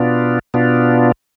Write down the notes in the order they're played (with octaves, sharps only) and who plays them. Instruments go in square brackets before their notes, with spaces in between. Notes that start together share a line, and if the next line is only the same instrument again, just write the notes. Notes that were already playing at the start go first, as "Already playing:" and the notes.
Already playing: [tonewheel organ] B2 B3 D4 F4
B2 B3 D4 F4